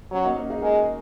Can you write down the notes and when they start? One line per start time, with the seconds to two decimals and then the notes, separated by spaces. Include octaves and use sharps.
0.12 F#3 C#4
0.25 A#3 D#4
0.37 C#4 F#4
0.50 D#4 G#4
0.62 G#3 F#4 A#4